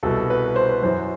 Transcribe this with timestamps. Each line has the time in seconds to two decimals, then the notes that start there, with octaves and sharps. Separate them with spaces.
0.03 C2 B2 A4
0.30 B4
0.56 C5
0.69 B4
0.82 F#2 E3 C5